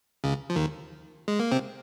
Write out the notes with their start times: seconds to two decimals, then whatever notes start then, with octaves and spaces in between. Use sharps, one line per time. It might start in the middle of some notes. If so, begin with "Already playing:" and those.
0.24 C#2 C#3
0.50 F3
0.56 D#2 D#3
1.28 G#3
1.40 A#3
1.52 C3 C4